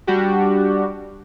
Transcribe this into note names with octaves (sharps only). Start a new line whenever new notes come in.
G3 D4 F#4 G4